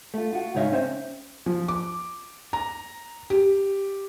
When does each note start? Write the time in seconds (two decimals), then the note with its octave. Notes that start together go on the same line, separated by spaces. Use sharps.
0.14 A3 F4
0.33 F4 F#4
0.55 G#2 C#3 D#4 C#5 E5 F5
0.72 C4 C#4 C5 C#5 E5
1.46 F3
1.68 D6
2.53 A#5
3.30 G4